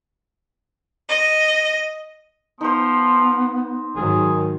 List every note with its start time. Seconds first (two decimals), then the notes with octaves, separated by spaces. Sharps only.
1.08 D#5
2.61 F3 B3 D#4 C5
3.96 G#2 D#3 F#3 G#4